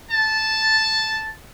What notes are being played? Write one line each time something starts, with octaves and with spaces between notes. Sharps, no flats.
A5